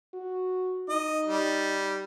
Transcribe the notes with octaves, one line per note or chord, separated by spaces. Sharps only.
F#4
D#4 D#5
G3